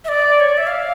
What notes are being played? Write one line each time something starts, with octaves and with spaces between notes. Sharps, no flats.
E5
D5
C#5
D5
E5
F5